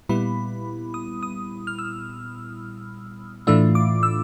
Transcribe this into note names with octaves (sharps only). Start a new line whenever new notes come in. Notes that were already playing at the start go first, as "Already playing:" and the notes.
A#2 G3 B3 E4 B5
D#6
D#6
F6
E6
A2 E3 A3 D4 F4 E6
D6
E6